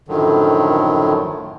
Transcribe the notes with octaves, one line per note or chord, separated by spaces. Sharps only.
F#2 A2 D3 D#3 F3 F#3